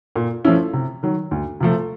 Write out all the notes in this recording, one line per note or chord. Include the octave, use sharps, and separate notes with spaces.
A#2
F3 A3 C#4 E4
C3
D#3 F#3
D2
C3 F3 A3